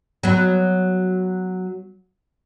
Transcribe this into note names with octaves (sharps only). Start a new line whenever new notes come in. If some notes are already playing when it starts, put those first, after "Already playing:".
F#3 B3